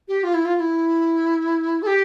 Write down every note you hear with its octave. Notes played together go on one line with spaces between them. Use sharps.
G4
F4
E4
F4
F4
E4
A4
G4